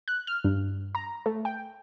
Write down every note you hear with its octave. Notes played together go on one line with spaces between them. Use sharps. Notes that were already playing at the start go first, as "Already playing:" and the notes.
F#6
F6
G2
A#5
A3
G5